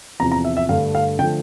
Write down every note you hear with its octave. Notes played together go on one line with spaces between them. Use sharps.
E2 C3 F3 A#5
A#5
E5
E5
G2 D3 A3 F5
F5
D3 F3 A3 G5